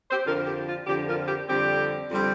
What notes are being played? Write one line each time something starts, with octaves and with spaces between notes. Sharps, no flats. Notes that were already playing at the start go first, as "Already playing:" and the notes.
G4 C5
F2 D3 F3 F4 A#4
G4
F4
F2 D3 F3 G4
F4 A#4
G4
F2 D3 G3 C4 G4
F2 D3 G3 C4